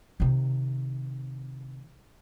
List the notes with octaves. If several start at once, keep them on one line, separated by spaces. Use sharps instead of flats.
C3 D#3